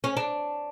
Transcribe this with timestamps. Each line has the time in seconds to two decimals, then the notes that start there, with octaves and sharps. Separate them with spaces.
0.04 C#4
0.17 D4